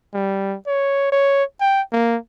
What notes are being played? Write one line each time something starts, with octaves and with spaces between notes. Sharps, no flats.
G3
C#5
C#5
G5
A#3